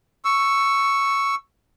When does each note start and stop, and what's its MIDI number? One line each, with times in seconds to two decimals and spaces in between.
0.25 1.35 85
0.25 1.35 88